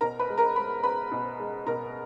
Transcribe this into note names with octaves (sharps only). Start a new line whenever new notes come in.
B2 A#4 A#5
B4 B5
G#3
A#4 A#5
G#3 B5
G#3 B4 B5
B2
G#3
B2 A#4 A#5